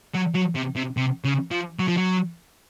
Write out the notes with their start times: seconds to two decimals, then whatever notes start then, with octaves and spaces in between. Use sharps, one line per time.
0.15 F#3
0.35 F#3
0.56 C3
0.76 C3
0.97 C3
1.24 C#3
1.51 F3
1.79 F#3
1.88 F3
1.97 F#3